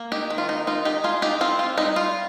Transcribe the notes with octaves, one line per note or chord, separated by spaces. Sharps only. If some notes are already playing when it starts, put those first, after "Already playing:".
Already playing: A#3
D#4 G4
D#3
F4
D#4
D#4 F4
D#4 G4
D#4 F4 G#4
D#4 G4
C4 F4
F4
G3 D#4
F4